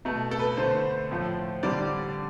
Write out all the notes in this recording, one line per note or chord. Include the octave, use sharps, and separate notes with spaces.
B2 A3
A4
B4
D3 A3 C5
A2 F3 A3
D3 G3 D5